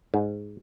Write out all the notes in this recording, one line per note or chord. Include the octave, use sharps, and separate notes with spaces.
G#2